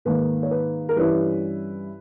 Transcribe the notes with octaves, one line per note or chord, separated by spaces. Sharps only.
G#2 D#3 A#3 D#4 B4
C#5
B4
A#4
G2 E3 G3 C#4 E4 B4